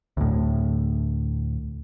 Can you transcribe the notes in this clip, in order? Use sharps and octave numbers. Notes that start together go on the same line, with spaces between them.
D2 A2